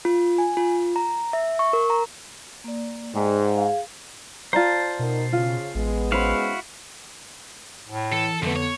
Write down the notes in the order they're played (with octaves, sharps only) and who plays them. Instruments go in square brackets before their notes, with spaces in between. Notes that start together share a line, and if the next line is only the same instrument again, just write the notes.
[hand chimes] F4
G#5
F4
A#5
E5
C#6
A#4
A#5
[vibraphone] A#3 D5
[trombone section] G#2 [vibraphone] D5 G5
[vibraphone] G#4 F5
[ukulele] F4 D5 A#5 [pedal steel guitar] C5 A5
[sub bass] B2 [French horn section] D#4 F#4 A#4
[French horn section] C#3 [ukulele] F4
[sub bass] A1 [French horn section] G#3 B3
[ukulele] C#4 C5 B5 [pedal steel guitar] E4 F#4 F5
[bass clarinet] A2
[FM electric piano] E3 [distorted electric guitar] A4
[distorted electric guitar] C2 A3 [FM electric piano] F2 B3 [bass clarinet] D3
[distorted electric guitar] C#5